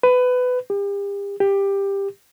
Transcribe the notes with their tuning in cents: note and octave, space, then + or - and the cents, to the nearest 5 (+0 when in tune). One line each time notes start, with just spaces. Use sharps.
B4 +20
G4 +40
G4 +15